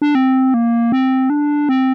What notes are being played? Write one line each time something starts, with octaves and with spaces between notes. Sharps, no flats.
D4
C4
A#3
C4
D4
C4